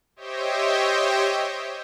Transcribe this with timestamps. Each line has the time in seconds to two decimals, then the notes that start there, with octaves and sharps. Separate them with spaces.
0.16 G4 C5 C#5 D#5 E5 G5